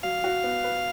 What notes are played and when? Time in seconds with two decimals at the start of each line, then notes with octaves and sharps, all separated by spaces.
0.03 F#3 F5
0.24 F#4
0.44 B3
0.64 B4